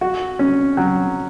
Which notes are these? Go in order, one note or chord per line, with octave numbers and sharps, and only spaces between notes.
F#4
C#4
F#3